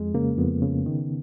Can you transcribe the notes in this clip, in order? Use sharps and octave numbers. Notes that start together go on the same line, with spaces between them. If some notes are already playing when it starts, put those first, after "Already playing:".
Already playing: F2 G#3
C#3 A#3
F2 B3
C#3
D#3